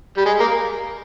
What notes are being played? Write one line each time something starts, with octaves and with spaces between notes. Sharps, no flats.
G3
G#3
A#3